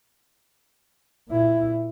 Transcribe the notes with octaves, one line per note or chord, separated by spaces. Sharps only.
A#2 E4